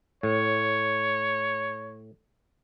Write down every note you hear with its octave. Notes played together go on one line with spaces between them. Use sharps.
A2 C#5